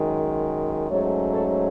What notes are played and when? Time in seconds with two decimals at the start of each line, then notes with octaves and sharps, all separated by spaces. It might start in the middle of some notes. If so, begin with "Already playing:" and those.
Already playing: F#2 D#3 G#3
0.90 G#2 F#3 A3 C#4 A4 C#5
1.32 A4 C#5